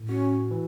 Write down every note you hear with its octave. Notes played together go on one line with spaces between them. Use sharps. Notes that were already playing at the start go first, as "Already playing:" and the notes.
Already playing: A2
C#4 F#4
E3